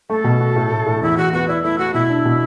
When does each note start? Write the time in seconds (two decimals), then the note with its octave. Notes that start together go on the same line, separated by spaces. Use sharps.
0.10 A3 A4
0.24 B2
0.40 F#4
0.56 A2
0.71 A2
0.86 A2
1.02 E2 E4
1.17 E2 F#4
1.33 B3 F#4
1.48 E4 D5
1.63 A3 E4
1.78 A3 F#4
1.94 B2 E4
2.09 D4
2.25 B2